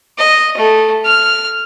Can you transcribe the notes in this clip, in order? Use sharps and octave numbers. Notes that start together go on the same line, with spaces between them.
D#5
A3
F6